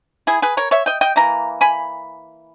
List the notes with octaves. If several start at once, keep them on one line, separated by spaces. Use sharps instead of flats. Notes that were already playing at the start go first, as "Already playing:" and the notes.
E4 G#4
G#4 B4
A#4 C#5
C#5 E5
D#5 G5
D#5 G5
E3 A#3 A#5
G#5 B5